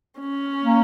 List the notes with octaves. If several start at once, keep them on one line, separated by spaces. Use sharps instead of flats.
C#4
A#3